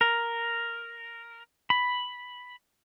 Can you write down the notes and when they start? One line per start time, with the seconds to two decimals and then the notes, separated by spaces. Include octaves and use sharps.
0.01 A#4
1.70 B5